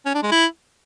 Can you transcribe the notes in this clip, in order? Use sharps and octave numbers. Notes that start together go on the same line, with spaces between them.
C#4
D4
G#3
E4